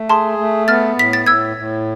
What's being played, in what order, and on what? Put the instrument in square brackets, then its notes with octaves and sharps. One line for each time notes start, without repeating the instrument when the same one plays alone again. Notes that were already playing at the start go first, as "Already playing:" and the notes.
Already playing: [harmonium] A3
[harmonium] G#4 [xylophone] A5 C6
[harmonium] A3
[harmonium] B3 [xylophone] F6 A6
[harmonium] A2 [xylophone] B6
[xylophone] A6
[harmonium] A2 [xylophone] E6 G#6
[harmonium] A2